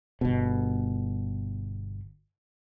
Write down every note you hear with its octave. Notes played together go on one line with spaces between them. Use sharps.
G1 B2